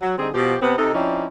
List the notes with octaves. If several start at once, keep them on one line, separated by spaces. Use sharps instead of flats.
F#3
D3 G3 C4 D#4 G#4
B2 F3 G4
C3 B3 C4
C3 D#4 A4
F3 C4 C#4 D#4 E4 D5